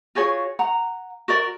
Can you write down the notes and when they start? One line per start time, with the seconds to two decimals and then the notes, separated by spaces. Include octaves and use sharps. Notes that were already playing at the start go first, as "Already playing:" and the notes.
0.15 F4 F#4 G#4 C#5
0.59 F#5 A#5
1.28 F#4 A#4 D5